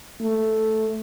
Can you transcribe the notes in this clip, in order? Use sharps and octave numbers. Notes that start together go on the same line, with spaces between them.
A3